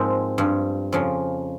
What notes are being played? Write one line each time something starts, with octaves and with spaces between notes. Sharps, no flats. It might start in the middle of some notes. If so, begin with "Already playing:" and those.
Already playing: G#2 F3 G#3 A#3 C4
G2 F3
F2 C#3 F3